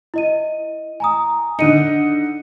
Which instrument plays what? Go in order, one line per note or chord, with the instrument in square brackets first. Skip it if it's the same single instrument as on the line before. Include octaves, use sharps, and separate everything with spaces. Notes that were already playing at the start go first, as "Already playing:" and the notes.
[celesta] E4 D#5 D#7
G#5 A#5 D#6
[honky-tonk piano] D3 D#4 [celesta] C#7 D#7